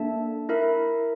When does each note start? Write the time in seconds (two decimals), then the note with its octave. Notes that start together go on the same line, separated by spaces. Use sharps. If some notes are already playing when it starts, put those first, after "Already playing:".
Already playing: A#3 D4 A4 E5 A5
0.49 E4 A#4 E5